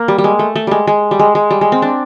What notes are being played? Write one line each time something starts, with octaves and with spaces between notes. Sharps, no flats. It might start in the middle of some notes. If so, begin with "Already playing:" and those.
Already playing: A#3
G3
G3
G#3
A3
A3
G3 G#3
G#3
G3
G#3
G#3
G3
G#3
C4
D4